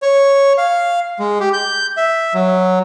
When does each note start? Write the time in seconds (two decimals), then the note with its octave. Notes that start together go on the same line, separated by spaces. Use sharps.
0.03 C#5
0.58 F5
1.19 G#3
1.40 G4
1.53 G6
1.97 E5
2.34 F#3